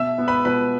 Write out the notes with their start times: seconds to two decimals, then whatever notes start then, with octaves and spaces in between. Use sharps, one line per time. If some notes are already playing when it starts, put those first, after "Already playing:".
Already playing: B2 E5 E6
0.18 B3
0.28 B4 B5
0.45 B2 B4 B5